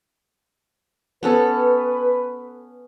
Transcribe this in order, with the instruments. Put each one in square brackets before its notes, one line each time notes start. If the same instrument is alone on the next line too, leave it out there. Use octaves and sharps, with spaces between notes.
[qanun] B3 C#4 A4 [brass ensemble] B4